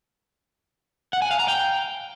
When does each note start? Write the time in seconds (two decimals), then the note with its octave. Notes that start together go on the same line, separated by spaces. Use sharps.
1.13 F#5
1.22 G#5
1.31 F5
1.39 A#5
1.48 G5